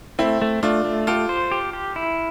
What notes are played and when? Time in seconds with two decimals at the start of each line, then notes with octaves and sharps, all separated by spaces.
0.19 A3 C4 E4
0.42 A3
0.63 A3 D4 F4
0.85 A3
1.07 F4 G4 A4
1.29 C5
1.52 G4
1.73 G4
1.96 E4